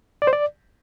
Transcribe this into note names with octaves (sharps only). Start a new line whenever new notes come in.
D5
C5
D5